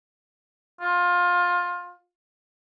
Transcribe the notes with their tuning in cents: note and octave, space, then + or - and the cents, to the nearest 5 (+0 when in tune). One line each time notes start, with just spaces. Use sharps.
F4 +20